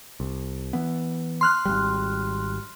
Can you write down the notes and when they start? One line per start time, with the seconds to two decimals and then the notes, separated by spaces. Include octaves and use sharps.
0.20 C2
0.73 E3 B3
1.41 C6 F6 F#6
1.66 G#1 C#2 G3